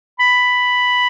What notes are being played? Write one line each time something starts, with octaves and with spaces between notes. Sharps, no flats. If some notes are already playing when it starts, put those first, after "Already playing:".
B5